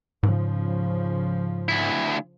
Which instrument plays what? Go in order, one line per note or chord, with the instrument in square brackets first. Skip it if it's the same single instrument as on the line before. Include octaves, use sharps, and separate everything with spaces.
[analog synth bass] G#2 [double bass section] C#3 F3
[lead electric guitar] D2 E4